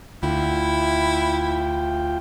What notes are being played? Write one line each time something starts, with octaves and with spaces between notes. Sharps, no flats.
D2 E4 F4 G5